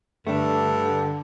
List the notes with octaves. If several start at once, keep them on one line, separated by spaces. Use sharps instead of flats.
G2 D3 A3 D4 A4